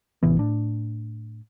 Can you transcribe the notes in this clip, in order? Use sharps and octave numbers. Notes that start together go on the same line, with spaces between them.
A1 C3 E3 B3
A2 D4